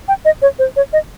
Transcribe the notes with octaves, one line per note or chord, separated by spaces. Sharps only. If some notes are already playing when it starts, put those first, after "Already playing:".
G5
D#5
C#5
C5
C#5
D#5